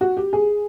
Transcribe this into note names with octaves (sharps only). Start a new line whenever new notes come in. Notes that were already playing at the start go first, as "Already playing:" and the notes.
F#4
G4
G#4